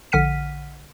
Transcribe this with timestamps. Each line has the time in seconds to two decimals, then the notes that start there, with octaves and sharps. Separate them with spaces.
0.12 A#1 D3 F#5 F6 B6 D#7